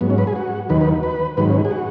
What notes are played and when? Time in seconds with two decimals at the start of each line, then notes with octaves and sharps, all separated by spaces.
0.01 G#2 F#3 B3
0.10 C#4
0.18 B4
0.27 G#4
0.36 F#4
0.69 D#2 D#3 F#3 B4
0.81 B4
1.03 B4
1.37 G#2 D#3 F#3 B4
1.49 C#4
1.65 G#4
1.71 F#4